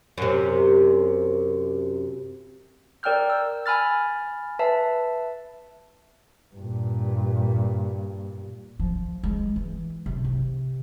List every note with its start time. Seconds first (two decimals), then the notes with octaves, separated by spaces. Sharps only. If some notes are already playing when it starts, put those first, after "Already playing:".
0.18 F#2 C3
3.03 A#4 D5 G5 E6 F6 G6
3.30 E6
3.66 G#5 B5 F6 A6
4.59 B4 E5 A5
6.55 G2 A#2
8.80 F3
9.23 G#3
9.56 E3
10.06 C3
10.24 C3